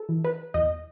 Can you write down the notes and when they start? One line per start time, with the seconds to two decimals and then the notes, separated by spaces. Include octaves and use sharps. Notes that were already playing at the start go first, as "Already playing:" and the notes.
Already playing: A4
0.09 E3
0.25 B4
0.54 E2 D#5